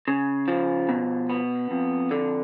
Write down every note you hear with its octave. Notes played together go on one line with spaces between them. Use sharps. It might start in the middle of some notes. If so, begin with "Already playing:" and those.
C#3
F3
B2
B3
F2
D3